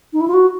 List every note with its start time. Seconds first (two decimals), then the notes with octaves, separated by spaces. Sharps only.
0.13 D#4
0.21 E4
0.28 F4
0.33 F#4